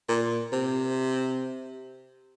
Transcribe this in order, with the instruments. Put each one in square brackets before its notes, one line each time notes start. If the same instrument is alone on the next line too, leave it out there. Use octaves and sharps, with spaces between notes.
[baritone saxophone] A#2
C3